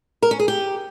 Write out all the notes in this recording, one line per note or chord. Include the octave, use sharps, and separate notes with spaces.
A#4
C#4
G#4
G4